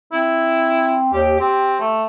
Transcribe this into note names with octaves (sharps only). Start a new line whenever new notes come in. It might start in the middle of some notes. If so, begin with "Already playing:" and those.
C4 E4
D#2 G4
C4 G4
A3